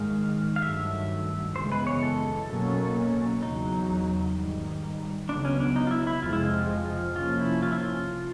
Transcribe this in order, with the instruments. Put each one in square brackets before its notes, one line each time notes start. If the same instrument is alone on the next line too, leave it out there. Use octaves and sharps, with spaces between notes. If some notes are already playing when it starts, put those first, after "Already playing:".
Already playing: [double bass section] G#2 D#3 G#3 [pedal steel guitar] F5
[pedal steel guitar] F5
[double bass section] G2 D#3 F#3 A3 [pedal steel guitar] E5
[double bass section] F#2 C#3 E3 G#3 B3 [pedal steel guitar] C5
[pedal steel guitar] B4
C#5
A4
[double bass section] B2 F#3 A#3 C#4
[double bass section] E2 C#3 F#3 [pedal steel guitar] D#4
[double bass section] G#2 D#3 G3
[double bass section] C#2 C#3 F#3 B3 [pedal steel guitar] D4
[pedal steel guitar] C#4
D4
D#4
F4
E4
E4
[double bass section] F2 C3 F3 G#3 [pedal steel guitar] F4
[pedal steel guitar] E4
F4
[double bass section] C3 F3 A#3 C#4 [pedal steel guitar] F4
[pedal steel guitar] E4
F4
E4
F4